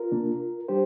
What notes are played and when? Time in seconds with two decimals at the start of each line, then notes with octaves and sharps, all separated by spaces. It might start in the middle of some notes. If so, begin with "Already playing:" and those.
Already playing: F4 A#4
0.12 C3 A#3 D4
0.68 G3 D4 G4 C5